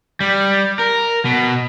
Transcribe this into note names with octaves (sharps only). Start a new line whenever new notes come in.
G3
A#4
B2